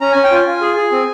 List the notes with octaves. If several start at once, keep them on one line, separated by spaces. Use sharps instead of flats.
C#4 A#5
C#4 G#5
G5
F4 G#5
F4
G#4
G#4
C4